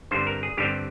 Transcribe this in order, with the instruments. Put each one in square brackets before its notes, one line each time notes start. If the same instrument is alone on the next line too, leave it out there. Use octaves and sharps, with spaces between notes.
[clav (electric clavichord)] G2 D3 G3 C4 C5
A#4
G#4
G2 D3 G3 C4 G4